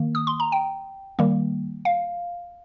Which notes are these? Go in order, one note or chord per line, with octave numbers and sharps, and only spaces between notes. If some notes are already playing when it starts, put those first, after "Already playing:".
Already playing: D#3 A#3
D#6
C6
A#5
G5
D#3 G3 A#3
F5